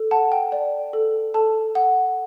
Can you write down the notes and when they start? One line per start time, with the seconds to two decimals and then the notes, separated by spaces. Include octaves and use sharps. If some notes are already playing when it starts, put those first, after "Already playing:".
Already playing: A4
0.11 F#5 A5
0.32 G5
0.52 D5
0.93 A4
1.34 A4 A5
1.75 F#5